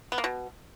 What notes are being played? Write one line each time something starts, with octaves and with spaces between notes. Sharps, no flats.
B3
A#3
B2